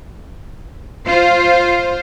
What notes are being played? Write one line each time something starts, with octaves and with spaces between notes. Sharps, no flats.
F4 C5